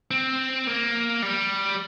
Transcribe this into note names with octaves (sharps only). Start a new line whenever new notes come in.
C4
A#3
G3